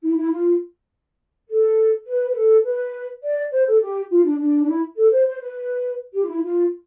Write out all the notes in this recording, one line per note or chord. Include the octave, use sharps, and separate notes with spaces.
E4
E4
F4
A4
B4
B4
A4
B4
D5
C5
A4
G4
F4
D4
D4
D4
E4
A4
C5
C5
B4
G4
F4
E4
F4